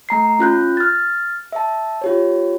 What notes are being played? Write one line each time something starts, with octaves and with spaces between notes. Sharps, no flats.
A3 A#5 C7
C#4 F4 F#6 G6
F6 A6
E5 A5
F4 G4 C#5